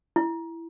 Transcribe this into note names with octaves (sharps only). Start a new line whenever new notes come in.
E4